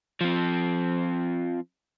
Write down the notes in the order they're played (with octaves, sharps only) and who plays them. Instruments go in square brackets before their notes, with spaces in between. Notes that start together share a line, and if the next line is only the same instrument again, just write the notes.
[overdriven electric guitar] F3 C4